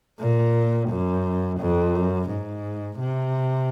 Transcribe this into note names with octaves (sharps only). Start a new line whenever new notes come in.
A#2
F#2
F2
F#2
G#2
C3